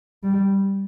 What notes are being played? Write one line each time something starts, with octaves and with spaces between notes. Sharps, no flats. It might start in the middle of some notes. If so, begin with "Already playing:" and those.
G3